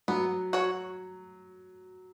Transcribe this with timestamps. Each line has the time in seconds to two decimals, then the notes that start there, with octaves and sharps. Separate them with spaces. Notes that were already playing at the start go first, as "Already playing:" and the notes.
0.08 F#3 B3
0.53 F#4 C#5